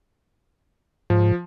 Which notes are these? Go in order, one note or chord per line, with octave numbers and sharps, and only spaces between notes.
G#2 F3